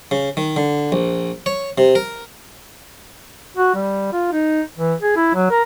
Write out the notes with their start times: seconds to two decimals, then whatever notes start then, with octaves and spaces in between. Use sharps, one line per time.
0.11 C#3
0.37 D#3
0.56 D3
0.92 A#1
1.46 C#5
1.78 C3
1.95 A#4
3.57 F#4
3.75 G3
4.12 F4
4.32 D#4
4.78 E3
5.01 G#4
5.16 E4
5.34 F#3
5.51 A#4